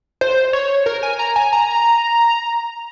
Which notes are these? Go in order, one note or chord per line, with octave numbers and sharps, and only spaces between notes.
C5
C#5
A#4
G#5
A#5
G#5
A#5